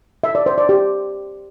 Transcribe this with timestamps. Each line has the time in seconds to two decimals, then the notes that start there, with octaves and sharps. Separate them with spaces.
0.24 E5
0.35 D5
0.46 C5
0.58 D5
0.69 G4